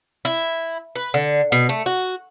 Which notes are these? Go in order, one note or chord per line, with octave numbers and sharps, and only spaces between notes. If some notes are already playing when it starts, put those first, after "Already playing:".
E4
B4
D3
B2
A3
F#4